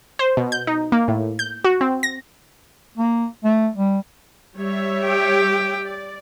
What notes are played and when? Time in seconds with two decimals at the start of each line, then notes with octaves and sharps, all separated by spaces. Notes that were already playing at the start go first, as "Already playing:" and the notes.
0.19 C5
0.37 B2
0.52 G6
0.67 D#4
0.92 A#3
1.08 A2
1.39 G6
1.64 F#4
1.81 C4
2.03 A#6
2.98 A#3
3.44 A3
3.76 G3
4.56 G3 C#5 E5
5.05 G4 G5
5.85 D5